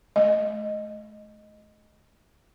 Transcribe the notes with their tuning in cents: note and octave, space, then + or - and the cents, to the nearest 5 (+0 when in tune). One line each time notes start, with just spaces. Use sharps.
A3 -40 D#5 +0